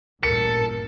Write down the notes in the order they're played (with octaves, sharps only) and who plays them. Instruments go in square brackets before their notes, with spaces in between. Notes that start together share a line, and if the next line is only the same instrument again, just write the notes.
[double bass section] A1 G2 A#2 [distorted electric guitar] A4 [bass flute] A#4 [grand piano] C#7